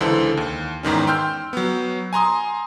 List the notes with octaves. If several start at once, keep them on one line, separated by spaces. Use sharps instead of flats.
C#2 D3 E3 E4 A4 C5
D#2
E2 G#2 D#3 C#4
G5 C6 E6 F6 G6
F#3 B3
G#5 A#5 C6 D#6